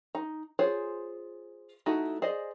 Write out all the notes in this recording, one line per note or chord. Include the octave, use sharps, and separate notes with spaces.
D#4
F4 G#4 C5 C#5
A3 D#4 E4 F#4 A4
G#4 C5 D5 D#5